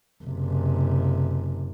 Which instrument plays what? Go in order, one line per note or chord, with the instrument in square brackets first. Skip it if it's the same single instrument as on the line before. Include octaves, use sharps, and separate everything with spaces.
[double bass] F#1 C3